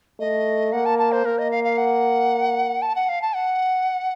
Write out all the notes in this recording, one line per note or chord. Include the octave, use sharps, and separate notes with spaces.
A3 D#5
A#3 F#5
A5
A5
C5
A#3 A#4
D#5
F5
F5
F#5
A5
F#5
F5
A5
F#5